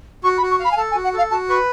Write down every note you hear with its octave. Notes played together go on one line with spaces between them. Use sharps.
F#4 C#6
B5
F#4
C#6
F5 B5
G#5
A4 A5
G#5
F#4
F#5
A4 F5
F#4 A5
B4 C#6